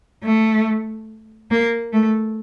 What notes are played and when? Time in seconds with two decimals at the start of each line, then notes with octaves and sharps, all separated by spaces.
0.24 A3
1.50 A#3
1.93 A3